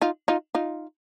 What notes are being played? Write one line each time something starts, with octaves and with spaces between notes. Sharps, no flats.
D#4 F4
D#4 F4
D#4 F4